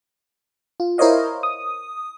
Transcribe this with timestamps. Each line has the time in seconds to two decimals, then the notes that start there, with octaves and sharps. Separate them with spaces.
0.80 F4
0.98 E4 A#4 C5 C#5 D#5 F5
1.43 D#6